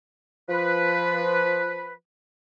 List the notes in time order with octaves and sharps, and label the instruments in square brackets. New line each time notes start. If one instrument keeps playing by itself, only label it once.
[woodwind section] F3 B4